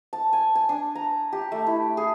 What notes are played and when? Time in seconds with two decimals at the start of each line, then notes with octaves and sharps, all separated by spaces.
0.13 A5
0.33 G#5
0.55 G#5
0.69 D4
0.95 A#5
1.32 G4
1.52 A3
1.67 E4
1.97 G#4